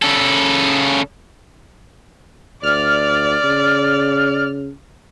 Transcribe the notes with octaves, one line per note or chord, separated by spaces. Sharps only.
C#3 A4
D2 D5 F6
C#3